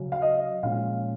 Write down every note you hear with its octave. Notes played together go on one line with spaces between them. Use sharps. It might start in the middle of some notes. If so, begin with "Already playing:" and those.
Already playing: C#3 F#3 C#4
F5
D#5
A#2 F3 G#3 C#4 F5